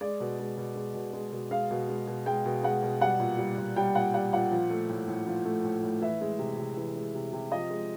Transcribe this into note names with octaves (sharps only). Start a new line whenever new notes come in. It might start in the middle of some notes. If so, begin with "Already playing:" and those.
G#3 D5
B2
G#3
B2
G#3
B2
G#3
B2
G#3 F5
B2
G#3
B2
G#3 G5
B2
G#3 F#5
B2
G3 F#5
A#2
G3
A#2
G3 G5
A#2 F#5
G3 F#5
A#2 F#5
F3
A3
A2
A2
F3
A3
A2
A2
E3 E5
G#3
C3
C3
E3
G#3
C3
C3
F3 D#5
G#3